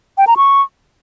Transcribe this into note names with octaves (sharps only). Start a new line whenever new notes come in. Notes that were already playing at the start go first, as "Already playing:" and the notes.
G5
A#5
C#6